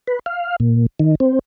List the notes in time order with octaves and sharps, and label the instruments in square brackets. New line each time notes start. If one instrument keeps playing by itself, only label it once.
[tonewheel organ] B4
F5
A#2
D#3
C4